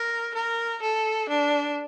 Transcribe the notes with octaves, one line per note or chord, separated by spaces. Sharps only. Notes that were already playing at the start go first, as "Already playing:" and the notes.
Already playing: A#4
A#4
A4
D4